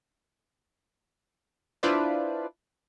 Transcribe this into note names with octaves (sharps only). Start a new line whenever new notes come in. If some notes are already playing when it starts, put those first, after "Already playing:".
D4 E4 F4 B4 C5 D5